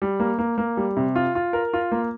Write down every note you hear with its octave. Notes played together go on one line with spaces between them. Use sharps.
G3
A#3
A#3
A#3
G3
C3
F4
F4
A#4
F4
A#3